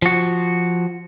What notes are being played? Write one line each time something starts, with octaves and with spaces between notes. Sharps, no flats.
F3 F#4